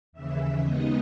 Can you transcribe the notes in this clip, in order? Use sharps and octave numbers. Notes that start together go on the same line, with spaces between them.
D#2 C#3 E3 E5
D#2 C#3 G#3 B3 D#4 D#5